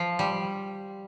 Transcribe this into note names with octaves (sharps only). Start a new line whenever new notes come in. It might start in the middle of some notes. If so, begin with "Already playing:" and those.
Already playing: F3
G3